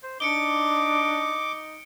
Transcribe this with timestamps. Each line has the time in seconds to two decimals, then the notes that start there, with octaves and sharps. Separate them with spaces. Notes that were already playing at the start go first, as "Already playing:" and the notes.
0.03 C5
0.20 D4 D#4 D6 C#7 D7 G7